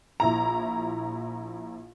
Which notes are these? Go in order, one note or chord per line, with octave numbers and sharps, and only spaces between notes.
A#1 E4 A#5